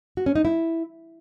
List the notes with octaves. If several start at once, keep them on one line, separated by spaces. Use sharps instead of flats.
F#4
C#4
D#4
E4